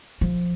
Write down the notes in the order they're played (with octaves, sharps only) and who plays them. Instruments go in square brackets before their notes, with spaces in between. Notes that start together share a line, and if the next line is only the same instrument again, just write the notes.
[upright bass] F3